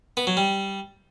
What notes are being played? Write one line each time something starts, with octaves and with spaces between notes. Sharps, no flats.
B3
F#3
G3